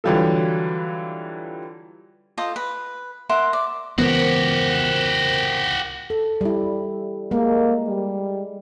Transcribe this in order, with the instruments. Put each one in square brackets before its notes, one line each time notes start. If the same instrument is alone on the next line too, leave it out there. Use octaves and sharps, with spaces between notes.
[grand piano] D3 E3 F#3 G3 F4 A4
[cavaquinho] F4 A4 C5 D#5
B4
A#4 E5 F#5 C6
D5
[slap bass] C#2 E3 B3 [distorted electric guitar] F#4 G4 [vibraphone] A#4 C5
[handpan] A4
G3 E4
[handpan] G#3 [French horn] A#3
[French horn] G3